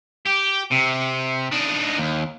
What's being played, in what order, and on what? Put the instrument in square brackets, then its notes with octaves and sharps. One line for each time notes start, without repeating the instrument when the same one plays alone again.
[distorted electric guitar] G4
C3
D4 D#4
D#2